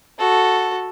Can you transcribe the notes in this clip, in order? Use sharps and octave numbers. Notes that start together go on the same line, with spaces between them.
F#4 A4